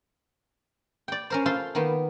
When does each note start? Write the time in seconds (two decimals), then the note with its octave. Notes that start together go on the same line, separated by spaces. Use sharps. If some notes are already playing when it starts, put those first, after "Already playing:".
1.08 D5 G5
1.30 C#4 A#4 C5
1.46 F4 A4 C5 F5 C6
1.75 D#3 A#3 B3